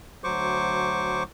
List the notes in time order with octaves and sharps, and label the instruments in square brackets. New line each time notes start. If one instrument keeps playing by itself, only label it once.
[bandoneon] D2 F#3 C5 C#6 D6